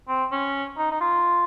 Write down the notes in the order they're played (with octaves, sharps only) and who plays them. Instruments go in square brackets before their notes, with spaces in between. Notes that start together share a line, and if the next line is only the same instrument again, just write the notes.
[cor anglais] C4
C#4
D#4
D#4
F4